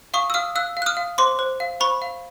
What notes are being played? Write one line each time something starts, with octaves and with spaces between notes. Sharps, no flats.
F5 C#6 D#6
E6
F5 D#6 F6
F5 E6 F#6
F5
F#6
D#6 F6
F5
C5 C6 D6
C5
F5
C5 B5 C#6
F5